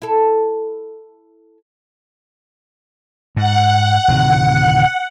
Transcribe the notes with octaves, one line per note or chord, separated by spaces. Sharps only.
E4 A4
G#2 F#5
D1 C3 D#3